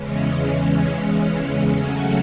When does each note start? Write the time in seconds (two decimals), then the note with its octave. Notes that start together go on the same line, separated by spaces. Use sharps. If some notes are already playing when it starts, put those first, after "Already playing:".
Already playing: E2 C#3 E3 G#3 C#4
1.71 C#3 F#3 A3 C#4 F#4